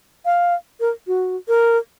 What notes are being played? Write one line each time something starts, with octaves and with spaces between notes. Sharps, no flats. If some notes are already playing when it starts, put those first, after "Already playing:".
F5
A#4
F#4
A#4